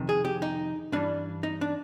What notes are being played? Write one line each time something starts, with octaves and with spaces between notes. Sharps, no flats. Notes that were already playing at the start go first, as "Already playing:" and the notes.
Already playing: F2 C3 D#3
G#4
G4
D#4
G2 E3 G3 D4
D#4
D4